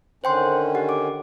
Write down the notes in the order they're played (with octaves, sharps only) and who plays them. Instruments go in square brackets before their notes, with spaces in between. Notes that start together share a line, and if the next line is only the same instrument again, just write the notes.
[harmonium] D3 D#3 C#4 [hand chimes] C5 G5 C6
[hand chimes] G4 F#5
D6